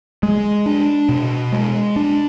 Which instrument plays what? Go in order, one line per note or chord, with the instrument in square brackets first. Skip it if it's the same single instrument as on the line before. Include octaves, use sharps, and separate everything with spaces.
[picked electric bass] G#3
D4
B2
G#3
D4